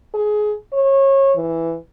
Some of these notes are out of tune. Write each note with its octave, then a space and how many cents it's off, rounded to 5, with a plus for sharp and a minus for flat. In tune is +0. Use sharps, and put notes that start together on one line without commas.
G#4 +20
C#5 -25
E3 +5